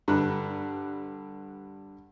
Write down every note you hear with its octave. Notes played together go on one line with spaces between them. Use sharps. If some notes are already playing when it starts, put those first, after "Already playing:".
G2 D3 B4 A#5 B5 F#6